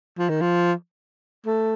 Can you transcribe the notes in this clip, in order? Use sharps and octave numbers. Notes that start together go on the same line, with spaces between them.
F3
D#3
F3
A3